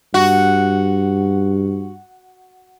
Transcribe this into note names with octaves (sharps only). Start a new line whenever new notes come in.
G2 F#4